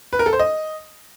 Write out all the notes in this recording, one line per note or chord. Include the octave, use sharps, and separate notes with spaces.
B4
A#4
A4
C5
D#5